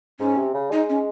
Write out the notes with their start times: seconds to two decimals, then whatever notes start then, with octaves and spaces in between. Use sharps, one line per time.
0.20 G#2 C#4
0.37 C3
0.54 C#3
0.71 G#3 D#4
0.89 C#4